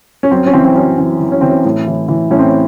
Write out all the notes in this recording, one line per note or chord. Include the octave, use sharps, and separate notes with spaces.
C#4
F#2 C4
C#4
E3 C4
C4
F#2 C#4
E3 C4
E3
C#4
E3 C4
C#4
A2
E3
E3
A2 C#4
C4